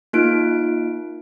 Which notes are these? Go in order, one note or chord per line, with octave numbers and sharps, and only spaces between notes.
A#3 D#4 F4 D7